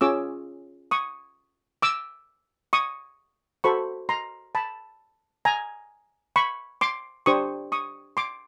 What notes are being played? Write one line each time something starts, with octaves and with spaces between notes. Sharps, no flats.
C#4 F4 G#4 C#5 D6 E6
C#6 D#6
D6 E6
C#6 D#6
F#4 A4 C5 B5 C#6
A#5 C6
A5 B5
G#5 A#5
B5 C#6
C6 D6
D4 G4 C5 C#6 D#6
C#6 D#6
C6 D6